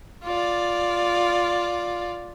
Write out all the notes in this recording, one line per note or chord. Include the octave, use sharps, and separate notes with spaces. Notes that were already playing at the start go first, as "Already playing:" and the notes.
F4 D5